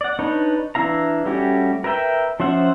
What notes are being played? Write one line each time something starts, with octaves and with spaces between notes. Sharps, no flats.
D5 F#5
D4 D#4 B4 C#5
E3 D4 E4 F5 A#5
G3 A3 C#4 F#4 G4
A#4 B4 E5 G5
F3 C#4 C5 E5 F#5